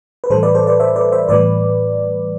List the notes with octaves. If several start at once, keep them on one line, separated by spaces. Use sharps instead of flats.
B4
A2 E3 G3 A4 C5
B4 D5
A4 C5
B4 D5
C5 E5
B4 D5
C5 E5
A2 E3 G3 B4 D5